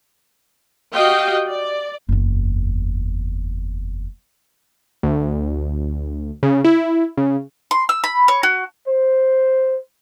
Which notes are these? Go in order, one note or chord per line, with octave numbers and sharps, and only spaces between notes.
F#4 G4 D#5 F5 G5
D5
F#1 E2
D2
C#3
E4
C#3
C6
E6
B5
C#5
F#4
C5